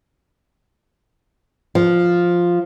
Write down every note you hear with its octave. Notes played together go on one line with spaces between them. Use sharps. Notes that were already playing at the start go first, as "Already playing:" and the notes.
F3